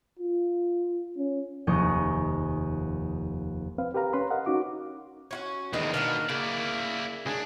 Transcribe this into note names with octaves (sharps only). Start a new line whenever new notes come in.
F4
C#4
F1 D#2 G#4 C#6 G6
C4 B4 F5
G4 A#4 B4 F5 A#5
C#4 B4 B5 C6
A#4 D#5 F5 F#5
C#4 D#4 F#4 D6
C#4 F4 F#4
E2 D3 D#3 G#3 B3 C4
B2 A#3 D4 F#5
C#3 A#3 E4 D5
C#2 D4 G#4